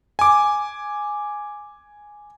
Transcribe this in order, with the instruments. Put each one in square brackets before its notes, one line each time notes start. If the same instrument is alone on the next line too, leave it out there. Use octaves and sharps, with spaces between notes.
[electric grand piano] G#5 D6